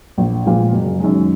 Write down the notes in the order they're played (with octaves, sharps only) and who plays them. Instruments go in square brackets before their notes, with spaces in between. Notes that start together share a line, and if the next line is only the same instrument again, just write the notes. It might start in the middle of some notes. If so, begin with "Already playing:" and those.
[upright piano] A#1
A#2 F3 G#3
F#1
F#2 D#3 G#3